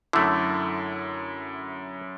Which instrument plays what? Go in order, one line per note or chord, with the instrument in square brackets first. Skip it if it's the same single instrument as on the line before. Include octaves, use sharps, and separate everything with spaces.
[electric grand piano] F#2 E4 [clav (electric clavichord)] D3 A3